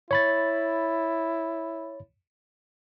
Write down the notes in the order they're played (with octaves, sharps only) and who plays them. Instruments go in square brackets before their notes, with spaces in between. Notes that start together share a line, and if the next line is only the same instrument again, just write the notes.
[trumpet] E4 [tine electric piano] C#5 B5 A6